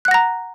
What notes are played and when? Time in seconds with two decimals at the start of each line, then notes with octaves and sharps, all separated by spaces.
0.05 F#6
0.08 F#5
0.11 A#6
0.14 A#5